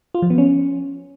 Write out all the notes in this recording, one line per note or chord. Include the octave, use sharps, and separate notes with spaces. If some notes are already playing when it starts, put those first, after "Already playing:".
F4
F3
B3
C#4